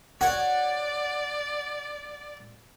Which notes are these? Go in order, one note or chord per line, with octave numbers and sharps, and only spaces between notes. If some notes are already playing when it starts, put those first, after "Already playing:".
F#4 C#5 D5